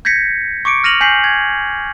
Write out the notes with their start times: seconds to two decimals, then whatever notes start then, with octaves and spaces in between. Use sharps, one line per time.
0.05 G6 G#6 A#6 B6 C#7
0.65 C#6 D6 C#7 D7
0.84 F6 A#6 D#7 F7 F#7
1.01 G#5 G6 B6 C7 F#7
1.24 G6 G#6